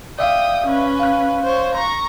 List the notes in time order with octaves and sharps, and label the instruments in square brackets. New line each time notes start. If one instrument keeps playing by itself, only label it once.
[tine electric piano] D5 E5 F5 [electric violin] G5 D#6
[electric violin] C#4 B4
[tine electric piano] F5 F#6
[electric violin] C5 C#5
A#5 C#6